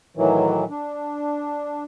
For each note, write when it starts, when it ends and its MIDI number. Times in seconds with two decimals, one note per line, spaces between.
0.17 0.64 45
0.17 0.64 51
0.17 0.64 52
0.17 0.64 54
0.70 1.84 62